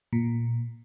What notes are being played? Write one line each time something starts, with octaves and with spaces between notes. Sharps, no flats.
A#2